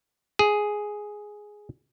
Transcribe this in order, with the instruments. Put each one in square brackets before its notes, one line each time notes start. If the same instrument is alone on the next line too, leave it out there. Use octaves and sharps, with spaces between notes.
[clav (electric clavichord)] G#4